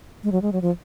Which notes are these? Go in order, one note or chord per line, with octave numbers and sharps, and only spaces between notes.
G#3
F#3
G#3
F#3
F3